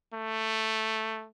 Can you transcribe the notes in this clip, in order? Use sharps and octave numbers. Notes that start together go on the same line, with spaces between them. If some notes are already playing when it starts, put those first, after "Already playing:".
A3